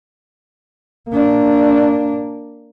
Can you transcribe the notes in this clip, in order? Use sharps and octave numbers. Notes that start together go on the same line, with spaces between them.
A#3 D4